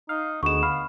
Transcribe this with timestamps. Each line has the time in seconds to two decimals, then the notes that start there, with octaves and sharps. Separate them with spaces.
0.09 D#4 F5
0.43 D2 G#3 B3 C#6 E7
0.63 F5 B5